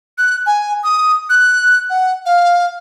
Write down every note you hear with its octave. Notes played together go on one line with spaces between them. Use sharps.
F#6
G#5
D#6
F#6
F#5
F5